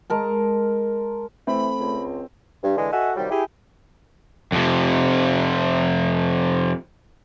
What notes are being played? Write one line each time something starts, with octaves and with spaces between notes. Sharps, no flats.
G#3 A#4 A5
E3 A3 C4 B5
C#2
G2
D3 E3 G#3
F#4 A4 D#5 E5 F#5 G#5
C3 D#3 F#3 G3
E4 G4 G#4
F2 C3